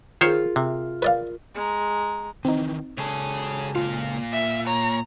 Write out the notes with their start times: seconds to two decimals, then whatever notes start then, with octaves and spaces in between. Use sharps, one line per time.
0.21 D#3 F4 G#4 A#4 C5 C#5
0.56 C3 E5
1.02 A#4 B4 D5 F5
1.55 G#3 A#5
2.45 D#3 E3 C4 D#4
2.98 C#2 G#4 A4 C#5
3.75 A#2 F4 F5
4.32 E5
4.67 C#5 A#5